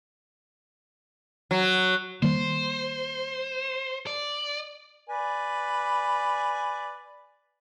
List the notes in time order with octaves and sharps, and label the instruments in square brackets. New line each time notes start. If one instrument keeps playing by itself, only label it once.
[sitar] F#3
[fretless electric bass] D#3 G3 A#3 [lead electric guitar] C5
[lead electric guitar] D5
[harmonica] B4 D5 G#5